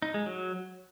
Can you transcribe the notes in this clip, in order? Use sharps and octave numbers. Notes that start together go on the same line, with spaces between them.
D#4
G#3
F#3